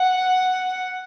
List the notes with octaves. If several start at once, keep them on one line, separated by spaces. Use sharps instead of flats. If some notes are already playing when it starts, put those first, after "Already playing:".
Already playing: F#5